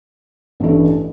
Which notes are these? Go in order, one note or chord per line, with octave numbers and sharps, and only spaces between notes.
A1 G2 E3 A3